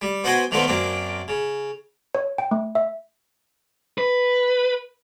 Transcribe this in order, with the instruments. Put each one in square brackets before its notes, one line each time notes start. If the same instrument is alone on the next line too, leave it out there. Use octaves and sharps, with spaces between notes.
[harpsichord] G3
B3 F#4 C5 D#5 G5 G#5
D3 D#3 F3 A3 B3 C4
F#2 A#3 C4 D4
C#3
[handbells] C#5
G5
A3
E5
[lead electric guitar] B4